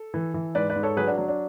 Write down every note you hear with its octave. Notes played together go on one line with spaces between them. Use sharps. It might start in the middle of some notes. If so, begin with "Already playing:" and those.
Already playing: A4
E3
E3
G#2 B4 D5
B4 D5
G#2
A4 C#5
F#3 G#4 B4
D4 F#4
F#3 D4
D4